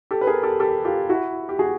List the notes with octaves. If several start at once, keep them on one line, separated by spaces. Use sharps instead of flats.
G4 A4
B4
G#4 A#4
G4 A4
G4 A4
F4 G4
E4 F#4
G4
F#4 G#4